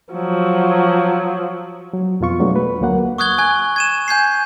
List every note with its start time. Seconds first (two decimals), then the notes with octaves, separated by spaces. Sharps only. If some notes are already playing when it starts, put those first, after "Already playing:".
0.14 F3 F#3
1.93 F#3
2.21 F2 B2 F4 C#6
2.40 F#3 G#3 A3 B3 D4
2.56 B4
2.81 D2 F#3 A#3 F#5
3.18 C#6 D#6 F#6 G#6 G7
3.38 G#5 F#6 G#6
3.76 G#6 D#7 E7
4.08 G#5 G6 G#6 C7